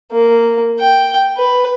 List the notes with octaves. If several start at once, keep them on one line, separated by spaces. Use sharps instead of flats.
A#3
G5
B4